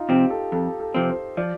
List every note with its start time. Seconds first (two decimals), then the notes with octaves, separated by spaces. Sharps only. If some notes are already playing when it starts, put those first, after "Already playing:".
Already playing: D#4 F4
0.09 C3 F3 C4 G4
0.30 A4
0.52 F2 A4
0.80 A4
0.94 C3 F3 C4
1.09 C5
1.37 F3 D5